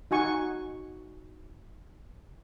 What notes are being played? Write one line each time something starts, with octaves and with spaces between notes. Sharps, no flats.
D#4 F#4 G#5 C#6